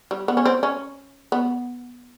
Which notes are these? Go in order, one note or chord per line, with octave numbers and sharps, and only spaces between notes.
G3
B3
C#4
C4
C#4
B3